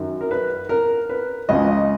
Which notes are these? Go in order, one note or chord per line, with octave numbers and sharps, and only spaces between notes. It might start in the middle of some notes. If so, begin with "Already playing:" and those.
Already playing: F#2 D#3 F#3
A#4
B4
A#4
B4
C#2 C#3 F3 D#5